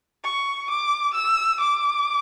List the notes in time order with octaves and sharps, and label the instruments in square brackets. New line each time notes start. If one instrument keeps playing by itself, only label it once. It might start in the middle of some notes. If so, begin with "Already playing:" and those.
[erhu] C#6
D6
E6
D6